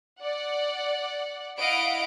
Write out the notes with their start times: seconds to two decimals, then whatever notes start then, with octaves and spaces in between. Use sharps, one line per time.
0.20 D5 F#5
1.59 E4 D#5 F5 F#5 B5 D7